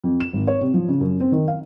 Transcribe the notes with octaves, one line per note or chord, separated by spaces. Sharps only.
F2
E7
G#1
C#5
C3
F3
C#3
F#2
C4
D#3
F5